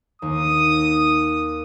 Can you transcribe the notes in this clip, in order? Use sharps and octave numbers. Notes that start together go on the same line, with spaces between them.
D#2 D#6